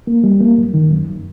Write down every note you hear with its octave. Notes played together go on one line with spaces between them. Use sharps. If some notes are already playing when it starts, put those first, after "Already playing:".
A#3
G3
A#3
F#2
D#3
F#2